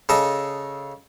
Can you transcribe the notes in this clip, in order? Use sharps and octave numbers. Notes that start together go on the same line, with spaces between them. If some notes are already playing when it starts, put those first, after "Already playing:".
C#3 A4 D#5